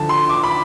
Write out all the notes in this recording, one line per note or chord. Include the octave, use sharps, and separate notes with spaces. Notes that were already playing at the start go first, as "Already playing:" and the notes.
Already playing: D2 D3 F3 A5
C6
D6
B5